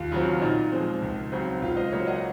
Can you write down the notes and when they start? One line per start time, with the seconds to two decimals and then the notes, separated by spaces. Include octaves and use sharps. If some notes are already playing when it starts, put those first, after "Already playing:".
Already playing: D#2 F4
0.11 C#3 F#3 C4 F4
0.42 A#2 D#4
0.72 F3 G#3 C4
1.02 C#2
1.32 C#3 F#3 C4
1.62 C#2 F4
1.77 C5 D#5
1.92 C#3 F#3 A#3 C#5 F5
2.07 D#5 F#5